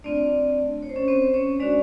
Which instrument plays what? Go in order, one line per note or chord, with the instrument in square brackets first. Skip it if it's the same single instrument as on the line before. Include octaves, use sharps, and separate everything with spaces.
[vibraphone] A3 C4 D4 F4 D5
C#5
C5
C#4 C#5
C4 C5
C#4 C#5
G#3 C#4 D4 F#4 D5